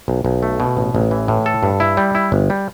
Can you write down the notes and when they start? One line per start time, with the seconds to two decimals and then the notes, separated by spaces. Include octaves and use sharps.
0.08 B1
0.25 B1
0.43 A3
0.60 B2
0.77 A1
0.95 A1
1.11 E3
1.28 A2
1.46 A4
1.63 G2
1.80 E4
1.97 G3
2.15 E4
2.32 G1
2.50 G3